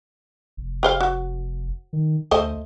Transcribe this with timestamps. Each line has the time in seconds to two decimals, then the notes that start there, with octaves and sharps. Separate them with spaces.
0.57 F1
0.83 G4 C5 F5
1.00 F#4
1.93 D#3
2.31 D2 A3 C5 D#5